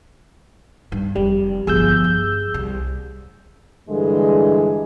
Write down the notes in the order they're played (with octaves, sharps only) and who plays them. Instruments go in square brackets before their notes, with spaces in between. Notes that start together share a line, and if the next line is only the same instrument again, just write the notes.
[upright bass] G2
[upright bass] F1 [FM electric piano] G3
[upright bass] G1 F3 [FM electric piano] G#4 E6 G6
[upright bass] G2
C2
[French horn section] G2 D3 E3 G#3